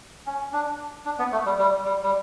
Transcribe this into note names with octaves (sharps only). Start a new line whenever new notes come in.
C#4
D4
D4
B3
A3
G3
G3
G3
G3